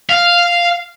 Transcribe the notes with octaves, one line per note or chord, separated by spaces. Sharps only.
F5